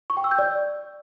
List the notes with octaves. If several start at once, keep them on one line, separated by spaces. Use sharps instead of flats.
C#6
G5
E6
G6
D5